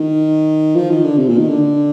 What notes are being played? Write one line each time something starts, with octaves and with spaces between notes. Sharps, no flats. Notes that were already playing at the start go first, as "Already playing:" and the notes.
Already playing: D#3
F3
D#3
D3
C3
A#2
D#3
D3